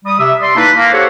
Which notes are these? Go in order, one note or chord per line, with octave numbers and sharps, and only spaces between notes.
G3 D#6
C3 E5
D5 C6
A#3 D#4 E4 A4 B4
A#3
G4 A4 C5 C#5 F#5